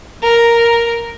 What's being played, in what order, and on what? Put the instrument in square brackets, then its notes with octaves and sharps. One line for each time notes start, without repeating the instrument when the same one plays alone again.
[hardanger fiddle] A#4